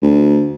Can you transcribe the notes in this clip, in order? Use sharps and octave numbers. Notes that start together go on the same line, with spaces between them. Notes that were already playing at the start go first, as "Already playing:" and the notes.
D2